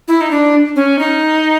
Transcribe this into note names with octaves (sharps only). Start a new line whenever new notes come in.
E4
D#4
D4
C#4
D#4